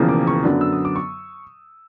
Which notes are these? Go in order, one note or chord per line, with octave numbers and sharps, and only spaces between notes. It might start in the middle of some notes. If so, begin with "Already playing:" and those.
Already playing: E1 E2 C#3 F3 A#3
D6
C#6
F#2 D3 F#3 B3 D4
E6
D#6
D6
C#6